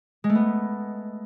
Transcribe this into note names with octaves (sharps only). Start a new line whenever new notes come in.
G#3
A3
B3